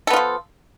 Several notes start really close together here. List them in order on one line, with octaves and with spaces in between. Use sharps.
A4 B3 F4 F3